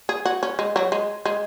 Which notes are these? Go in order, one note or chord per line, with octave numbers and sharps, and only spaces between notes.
G#4
F#4
C#4
G#3
F#3
G#3
G#3